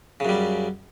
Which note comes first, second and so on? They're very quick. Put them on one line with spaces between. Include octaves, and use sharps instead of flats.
C#3 F#2 G3